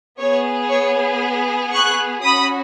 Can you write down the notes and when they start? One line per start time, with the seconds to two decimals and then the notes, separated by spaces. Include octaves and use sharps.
0.20 B3 G#4 C#5
0.70 C#5
1.73 C#6 F#6
2.24 C#4 F#4 B5 D#6